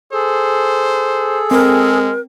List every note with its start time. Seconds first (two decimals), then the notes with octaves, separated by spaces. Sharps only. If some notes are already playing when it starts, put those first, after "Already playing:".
0.13 G#4 A4 C5
1.51 G#3 C4 A#4